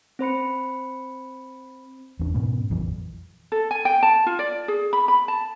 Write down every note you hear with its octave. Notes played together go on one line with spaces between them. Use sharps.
C4 C5 B5 C#7
E2 C#4 D4
G#2 B2 B3 C#4
A#1 F2 E3 F#3
A4
G#5
G5
A5
F4
D5
G#4
B5
B5
A5